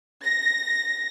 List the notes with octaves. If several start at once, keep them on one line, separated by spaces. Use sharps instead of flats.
A#6